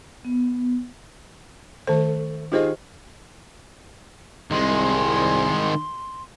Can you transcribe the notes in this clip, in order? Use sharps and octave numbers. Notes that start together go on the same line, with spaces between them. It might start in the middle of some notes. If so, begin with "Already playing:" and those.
B3
D#3 A3 C5
D#3 F4 G4 G#4 C5 D#5
C2 D#3 G#3 C6